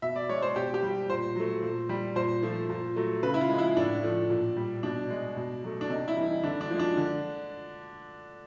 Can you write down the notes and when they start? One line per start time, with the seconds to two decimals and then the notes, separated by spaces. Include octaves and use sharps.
0.02 B2 E5
0.16 D5
0.29 G#3 C#5
0.42 C5
0.56 B2 G4
0.74 G4
0.83 G3
1.10 A#2 C5
1.36 F#3 A3
1.62 A#2
1.89 G3
2.16 A#2 C5
2.43 F3 A3
2.70 A#2
2.96 F#3 A3
3.23 C#3 B4
3.34 E4
3.41 F4
3.50 F3 G#3
3.58 E4
3.77 A2 D4
4.03 F3 A3
4.30 A#2
4.57 G3
4.83 B2 D4
5.10 G#3
5.37 B2
5.64 F#3 A3
5.81 D4
5.90 C3 D#4
6.08 E4
6.16 E3 G3
6.26 D#4
6.44 D3 D4
6.61 D4
6.70 F3 G#3
6.79 D4
6.97 D3